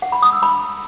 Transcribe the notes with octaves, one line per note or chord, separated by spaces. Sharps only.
F#5
B5
D#6
E6
B5